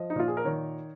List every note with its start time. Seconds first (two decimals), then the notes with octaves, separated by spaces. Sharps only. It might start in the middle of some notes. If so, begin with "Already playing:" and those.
Already playing: F3 D#5
0.10 D#4
0.16 A#2 F4
0.28 G#4
0.37 A#4
0.45 D#3 C#5